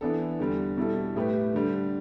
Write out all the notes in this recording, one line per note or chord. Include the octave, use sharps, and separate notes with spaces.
E3 B3 D4 A4
E2 D3 G3
B2 G3 E4 A4
A2 A3 G4 B4
D3 G3 D4